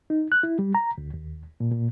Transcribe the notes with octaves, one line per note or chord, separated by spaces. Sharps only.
D#4
F#6
E4
G3
A#5
D2
D#2
A#2
A#2